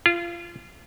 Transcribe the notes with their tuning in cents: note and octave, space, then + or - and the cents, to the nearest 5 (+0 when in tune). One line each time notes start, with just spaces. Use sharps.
F4 -25